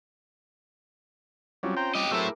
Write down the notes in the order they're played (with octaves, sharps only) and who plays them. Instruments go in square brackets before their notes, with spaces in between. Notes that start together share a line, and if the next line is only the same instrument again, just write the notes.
[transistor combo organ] F#3 G3 [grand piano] C4 C#4 F4
[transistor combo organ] C5 G5 A#5
[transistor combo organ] G3 [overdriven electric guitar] G4 D#5
[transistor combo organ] F#3 C4 E5 [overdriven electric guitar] A3 E4 [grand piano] G#4 A#4 D6